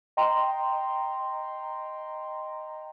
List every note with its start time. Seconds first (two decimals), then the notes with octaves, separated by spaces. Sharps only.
0.17 D#5 G5 A#5 C6